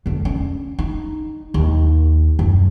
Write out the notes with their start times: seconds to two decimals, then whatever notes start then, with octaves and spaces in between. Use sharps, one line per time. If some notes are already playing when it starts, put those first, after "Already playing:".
0.06 E2 D3
0.25 C#4
0.79 D#4
1.54 D#2
2.39 F#2